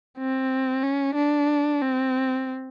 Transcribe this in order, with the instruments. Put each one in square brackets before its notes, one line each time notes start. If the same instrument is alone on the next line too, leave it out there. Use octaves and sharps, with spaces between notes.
[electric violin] C4
C#4
D4
C4